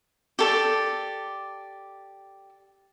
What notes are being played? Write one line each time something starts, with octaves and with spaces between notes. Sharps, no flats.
G4 A4 D5